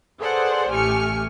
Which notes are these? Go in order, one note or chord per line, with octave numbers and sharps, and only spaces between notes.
G#4 A4 B4 C5 D5 F#5
A1 A3 G4 G#5 F6 C#7